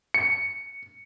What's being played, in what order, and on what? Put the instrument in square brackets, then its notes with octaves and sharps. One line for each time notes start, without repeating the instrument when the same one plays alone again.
[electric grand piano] C#7